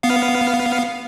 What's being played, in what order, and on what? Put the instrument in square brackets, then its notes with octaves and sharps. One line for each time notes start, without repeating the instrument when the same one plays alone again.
[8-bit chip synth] B3 F5